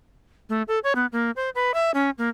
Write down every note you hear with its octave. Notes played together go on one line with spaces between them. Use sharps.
A3
A4
C#5
B3
A#3
C5
B4
E5
C#4
A#3